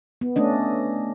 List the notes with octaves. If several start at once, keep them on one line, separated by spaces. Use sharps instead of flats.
B3
A3 C#4 D4 D#5